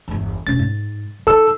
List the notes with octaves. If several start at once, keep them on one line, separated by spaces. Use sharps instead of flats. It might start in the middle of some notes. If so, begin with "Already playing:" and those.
G1 E2
E1 C#4 A6
G#2
D#4 A4 E6